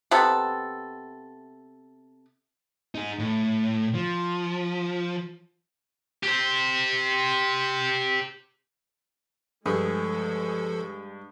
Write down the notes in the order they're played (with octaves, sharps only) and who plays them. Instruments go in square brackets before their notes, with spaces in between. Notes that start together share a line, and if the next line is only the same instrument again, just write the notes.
[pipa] C3 B3 A4
[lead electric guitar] D#4 G#4
A2
F3
[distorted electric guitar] G4 C5
[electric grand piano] G2 [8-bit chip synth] F3 A4 [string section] G#3 [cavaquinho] G#4